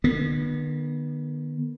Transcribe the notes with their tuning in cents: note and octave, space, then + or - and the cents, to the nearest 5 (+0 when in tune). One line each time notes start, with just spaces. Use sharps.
D3 +45 B3 -30